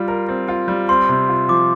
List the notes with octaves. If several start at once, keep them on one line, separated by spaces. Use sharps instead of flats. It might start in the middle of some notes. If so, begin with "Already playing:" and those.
Already playing: G3 F4
A#4
C4
F4
G3
C4 C6
C3
F4
F3 D6